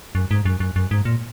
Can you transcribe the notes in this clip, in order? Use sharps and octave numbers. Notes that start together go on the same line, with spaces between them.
F#2
G#2
F#2
F#2
F#2
G#2
A#2